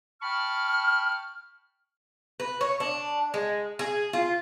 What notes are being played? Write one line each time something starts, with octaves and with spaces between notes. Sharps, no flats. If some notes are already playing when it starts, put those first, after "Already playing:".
G5 A5 B5 C#6 F6
B4
C#5
D4
G#3
G#4
F4